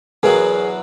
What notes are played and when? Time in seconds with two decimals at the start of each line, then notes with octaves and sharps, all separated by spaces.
0.23 E2 B2 F#3 G#4 A#4